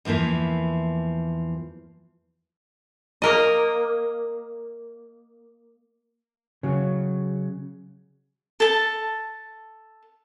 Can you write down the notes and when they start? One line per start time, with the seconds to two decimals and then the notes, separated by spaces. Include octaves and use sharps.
0.05 E2 E3 F3 A#3 E4
3.22 A#3 A#4 D#5
6.63 C#3 F#3
8.60 A4 A5